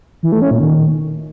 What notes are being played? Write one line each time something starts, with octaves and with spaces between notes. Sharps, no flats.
E3
A3
C#4
A#2
D#3